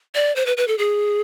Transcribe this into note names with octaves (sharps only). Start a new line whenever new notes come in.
D5
C5
B4
B4
A4
G#4